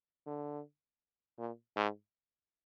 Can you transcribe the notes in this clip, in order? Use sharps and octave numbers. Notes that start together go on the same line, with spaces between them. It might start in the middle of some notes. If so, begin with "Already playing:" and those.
D3
A#2
G#2